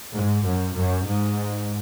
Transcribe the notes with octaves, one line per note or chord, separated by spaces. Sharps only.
G#2
F#2
F#2
G#2